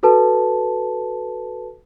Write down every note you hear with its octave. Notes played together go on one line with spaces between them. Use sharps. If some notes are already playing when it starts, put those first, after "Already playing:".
F#4 A4 B4 A5